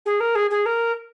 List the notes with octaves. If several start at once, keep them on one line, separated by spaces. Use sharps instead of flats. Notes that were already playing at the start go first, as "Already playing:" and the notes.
G#4
A#4
G#4
G#4
A#4